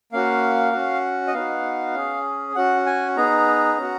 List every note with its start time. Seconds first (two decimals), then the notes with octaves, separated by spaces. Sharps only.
0.12 A#3 C#4 F#4 F5
0.73 C#4 F#4
1.27 D#5
1.34 B3 D#4 F#4 F5
1.95 C#4 G#4
2.55 C#4 F#4 F#5
2.86 G#5
3.17 B3 D#4 G#4 A#5
3.78 C#4 F#4